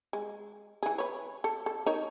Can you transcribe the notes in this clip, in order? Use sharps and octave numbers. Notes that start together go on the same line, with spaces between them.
G#3
E3 G#4
B4 C#5
A4
A4
D#4 A#4 C#5